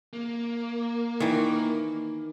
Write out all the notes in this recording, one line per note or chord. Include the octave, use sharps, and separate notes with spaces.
A#3
D#3 E3